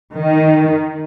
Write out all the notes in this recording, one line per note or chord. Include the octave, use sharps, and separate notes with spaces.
D#3